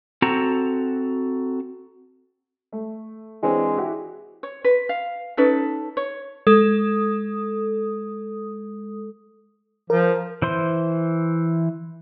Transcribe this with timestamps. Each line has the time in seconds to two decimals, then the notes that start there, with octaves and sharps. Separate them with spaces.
0.22 C4 F#4 A4 A#5
2.72 A3
3.43 E3 G#3 C4 D4
3.78 E4 F#4 G4
4.43 C#5
4.64 B4
4.89 F5
5.37 C#4 D#4 A4 B4
5.97 C#5
6.47 G#3 A4 D#6
9.90 F3 A#4
10.42 E3 C5 C6